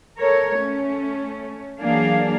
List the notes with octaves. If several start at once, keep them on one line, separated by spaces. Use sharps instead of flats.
A4 A#4 C#5
A3 C#4
E3 F#3 A#3 D4 G#4 F5